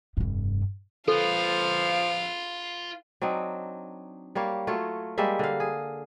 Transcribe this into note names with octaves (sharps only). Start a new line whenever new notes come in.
F1 G2
F3 F4 A4 B4 F5
F#3 C4 D4 D#4
G3 A#3 C#5 F5
F#3 A3 F4 C#5
G3 G#3 A#3 E5
D3 F5
G#4